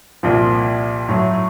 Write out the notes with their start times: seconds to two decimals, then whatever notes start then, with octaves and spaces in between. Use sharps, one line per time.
0.23 C2 A#2 F3
1.09 A2 F#3 A3